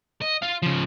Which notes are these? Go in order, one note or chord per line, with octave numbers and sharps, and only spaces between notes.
D#5
F4 F5
C#3 F3